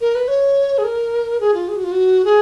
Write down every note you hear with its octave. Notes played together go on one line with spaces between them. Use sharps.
A#4
B4
C#5
G#4
A#4
G#4
F4
G#4
F#4
F4
F#4
G#4